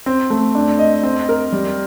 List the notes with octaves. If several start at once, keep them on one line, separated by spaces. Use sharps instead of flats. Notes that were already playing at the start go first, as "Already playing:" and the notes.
C4
A3
D4
D#5
C4
A#4
G3